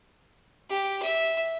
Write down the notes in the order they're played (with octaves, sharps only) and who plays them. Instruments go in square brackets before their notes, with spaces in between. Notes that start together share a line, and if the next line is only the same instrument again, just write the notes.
[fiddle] G4
E5